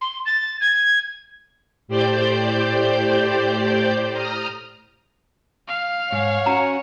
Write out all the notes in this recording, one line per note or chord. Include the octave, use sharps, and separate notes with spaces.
C6
A6
G#6
A2 G4 C5 D5 G6
A#5 D#6 F6
F5
G#2 C#5 F#5
C#4 F#4 A#5